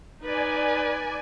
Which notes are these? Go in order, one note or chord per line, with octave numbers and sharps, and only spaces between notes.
D#4 B4 D5 G#5